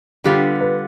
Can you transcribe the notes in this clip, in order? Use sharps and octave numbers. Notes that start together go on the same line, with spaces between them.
D3 G3 B3 F4 G4
B4